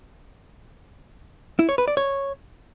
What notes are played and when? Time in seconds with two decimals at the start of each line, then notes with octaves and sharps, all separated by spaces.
1.59 E4
1.69 C#5
1.78 B4
1.88 D5
1.97 C#5